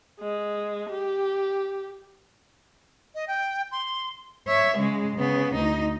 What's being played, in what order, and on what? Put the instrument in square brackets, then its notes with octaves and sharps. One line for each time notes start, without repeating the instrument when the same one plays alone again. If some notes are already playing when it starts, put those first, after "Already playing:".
[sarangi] G#3
G4
[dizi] D#5
G5
C6
[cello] C#5 E5
C#3 G#3
C#3 B3
D2 D#4